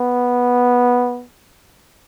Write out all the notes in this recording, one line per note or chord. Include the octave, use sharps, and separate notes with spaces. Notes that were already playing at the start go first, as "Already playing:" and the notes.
Already playing: B3